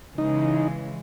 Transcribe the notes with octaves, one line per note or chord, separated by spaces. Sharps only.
C#3 E3 G#3 D#4